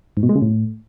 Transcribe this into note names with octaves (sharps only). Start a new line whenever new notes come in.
G#2
B2
G#3
C#3
A2